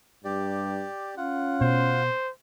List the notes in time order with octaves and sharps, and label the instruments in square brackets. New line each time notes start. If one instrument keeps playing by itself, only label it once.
[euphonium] G2 [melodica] G4 D5
[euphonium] C#4 [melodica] F4 F#5
[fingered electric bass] B2 [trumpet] C5